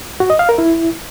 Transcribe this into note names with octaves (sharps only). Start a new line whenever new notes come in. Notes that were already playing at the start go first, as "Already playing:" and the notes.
F#4
D#5
F5
A#4
E4